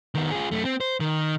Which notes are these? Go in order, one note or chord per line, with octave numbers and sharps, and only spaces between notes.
D#3 B3
F4 G#4
F#2 A3
C4
C5
D#3